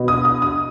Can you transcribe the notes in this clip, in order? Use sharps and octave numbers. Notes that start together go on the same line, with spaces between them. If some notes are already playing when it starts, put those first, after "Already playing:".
Already playing: B2
D#6
D#6
D#6